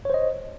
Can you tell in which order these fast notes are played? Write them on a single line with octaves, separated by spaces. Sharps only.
C#5 C5 D#5